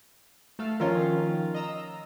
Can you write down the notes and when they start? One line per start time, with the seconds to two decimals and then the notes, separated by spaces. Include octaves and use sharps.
0.59 A3 A4 F5
0.80 D#3 F3 C#4 F4 A#4
1.55 D#5 A#5 E6